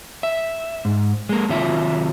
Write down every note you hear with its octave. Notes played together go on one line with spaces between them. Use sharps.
E5
G#2
G#3 A#3
C3 D#3 F#3 F4 E5